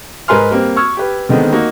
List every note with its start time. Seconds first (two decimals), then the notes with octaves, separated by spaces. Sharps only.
0.28 G#2 A#4 B4 G#5 C6 F6
0.50 G3 A#3 C4
0.76 C#6 E6 F6 G#6
0.97 G4 B4
1.29 D3 D#3 G#3 B3 C4
1.52 A#3 D#4 F#4